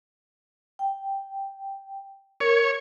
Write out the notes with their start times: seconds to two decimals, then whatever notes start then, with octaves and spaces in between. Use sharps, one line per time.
0.79 G5
2.40 A#4 C#5